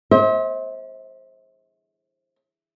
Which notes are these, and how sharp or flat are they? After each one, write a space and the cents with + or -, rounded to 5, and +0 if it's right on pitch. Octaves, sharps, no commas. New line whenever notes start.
C5 +20 E5 -45